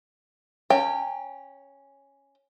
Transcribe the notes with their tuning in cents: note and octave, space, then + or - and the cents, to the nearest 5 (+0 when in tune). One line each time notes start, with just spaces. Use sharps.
C#4 +0 G5 +15 A#5 -40